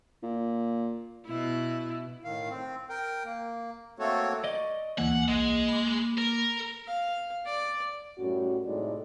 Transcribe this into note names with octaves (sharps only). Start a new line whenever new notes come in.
A#2
B2 E4
A2 D#3 F5
C4
A#4 G5
A#3
A3 A#3 C4 F#4 A4 C#5
D5 D#5 C#6
D2 E3 A#3 F#5 G#5
B1 G#3
B5 D6
A#4
F5
D5
F#2 A2 G3 C#4 F#4
A2 C3 G#3 D#4 D5